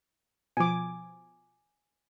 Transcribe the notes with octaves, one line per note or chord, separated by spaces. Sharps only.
B2 F3 G#5 D6